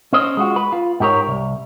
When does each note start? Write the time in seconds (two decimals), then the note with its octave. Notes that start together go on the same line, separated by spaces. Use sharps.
0.13 C#4 C5 D#5
0.37 G#3 F4 F#4
0.56 B4
0.72 F4
1.00 G#2 D#4 G4 A#4 C#5
1.28 C2